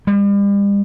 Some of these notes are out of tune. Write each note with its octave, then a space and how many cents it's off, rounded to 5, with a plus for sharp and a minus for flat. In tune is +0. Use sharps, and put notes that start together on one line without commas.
G3 +40